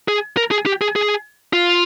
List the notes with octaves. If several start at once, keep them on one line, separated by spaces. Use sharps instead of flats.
G#4
A#4
G#4
G4
G#4
G#4
F4